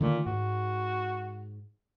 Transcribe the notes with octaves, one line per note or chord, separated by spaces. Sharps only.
A#2 D3 D#3 A3
G#2 F#4